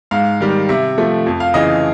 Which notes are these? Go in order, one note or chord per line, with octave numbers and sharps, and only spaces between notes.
G#2 F5
D#3 G3
C3 E5
F3 A3
F2
F5
C#3 E3 D#5